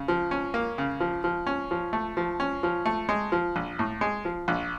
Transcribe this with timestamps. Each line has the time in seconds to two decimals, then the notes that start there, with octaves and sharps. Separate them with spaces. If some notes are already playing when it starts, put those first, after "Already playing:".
Already playing: C#3
0.08 F3
0.31 C#4
0.54 A#3
0.78 C#3
1.00 F3
1.24 F3
1.47 C#4
1.71 F3
1.93 A3
2.17 F3
2.40 C#4
2.63 F3
2.86 A3
3.09 G#3
3.32 F3
3.56 A#1
3.79 A2
4.01 G#3
4.25 F3
4.48 A#1